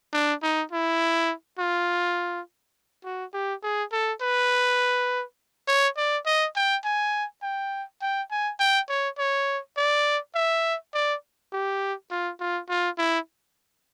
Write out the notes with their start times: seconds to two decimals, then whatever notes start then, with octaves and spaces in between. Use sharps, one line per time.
0.13 D4
0.42 D#4
0.72 E4
1.59 F4
3.04 F#4
3.34 G4
3.63 G#4
3.92 A4
4.21 B4
5.68 C#5
5.97 D5
6.26 D#5
6.56 G5
6.84 G#5
7.43 G5
8.02 G5
8.31 G#5
8.59 G5
8.89 C#5
9.18 C#5
9.77 D5
10.35 E5
10.94 D5
11.52 G4
12.11 F4
12.40 F4
12.69 F4
12.98 E4